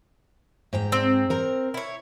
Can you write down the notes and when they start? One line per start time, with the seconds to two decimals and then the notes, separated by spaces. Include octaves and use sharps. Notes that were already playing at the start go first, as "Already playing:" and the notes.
0.73 G#2 G5 A#5
0.92 C4
1.30 A#4 A#5
1.74 E4 C#5